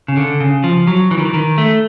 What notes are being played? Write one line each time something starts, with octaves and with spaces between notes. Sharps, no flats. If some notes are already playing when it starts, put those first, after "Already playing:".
C#3
D3
C#3
F3
F#3
E3
D#3
E3
D#3
A3